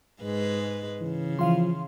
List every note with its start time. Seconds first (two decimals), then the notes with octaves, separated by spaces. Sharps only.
0.22 G#2 G#3 B4
1.01 C#3 E3
1.39 E3 F3 F5 C6